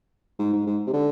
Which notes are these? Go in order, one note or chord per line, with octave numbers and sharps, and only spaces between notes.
G#2
G#2
G#2
C3
D3